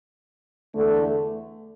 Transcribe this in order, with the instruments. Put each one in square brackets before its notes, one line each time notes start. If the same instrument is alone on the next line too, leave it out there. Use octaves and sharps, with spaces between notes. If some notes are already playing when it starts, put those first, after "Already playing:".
[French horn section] E2 D3 A3